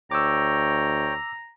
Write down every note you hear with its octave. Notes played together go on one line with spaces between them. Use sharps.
D2 C#5 G5 A#5 D6 E6